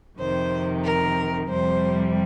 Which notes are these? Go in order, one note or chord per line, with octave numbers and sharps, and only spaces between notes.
F2 C3 D#3 C5
A#4
F2 C3 G3 C5